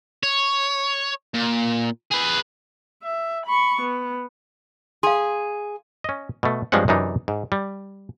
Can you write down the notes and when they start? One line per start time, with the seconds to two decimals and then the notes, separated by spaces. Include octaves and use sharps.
0.23 C#5
1.34 A#2
2.11 G#4 B4
3.04 E5
3.46 B5 C#6
3.81 B3
5.03 G#4 F5 C6
6.04 C#4 D#5
6.43 B2 A3
6.72 G2 F3 G#3 C4 C#4 F#5
6.88 F#2 C3 E3 D4 D#4
7.28 G#2
7.52 G3